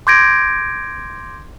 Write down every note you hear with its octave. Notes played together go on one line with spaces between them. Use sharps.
C6 D6 G6 G#6 A#6 D7